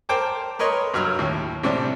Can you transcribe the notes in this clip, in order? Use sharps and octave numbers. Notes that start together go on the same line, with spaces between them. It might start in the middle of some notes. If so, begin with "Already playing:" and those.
A#4 C5 G5 A5 D6
A#4 B4 C#5 D#5 C6
G2 F#3 E6 F6
D#2 A2
A2 C3 G3 D4